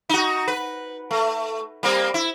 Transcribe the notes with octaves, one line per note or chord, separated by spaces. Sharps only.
D#4 F#4
B4
A3
G3 A#3 C4
E4